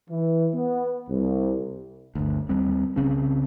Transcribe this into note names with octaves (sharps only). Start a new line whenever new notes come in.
E3
B3
C2
G1 D2
D#2 G3 C4
C2 C#3 C4 C#4